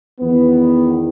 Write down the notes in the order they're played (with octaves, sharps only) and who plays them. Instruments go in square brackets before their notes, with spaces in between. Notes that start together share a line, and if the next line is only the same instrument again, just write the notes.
[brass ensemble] E2 D#3 B3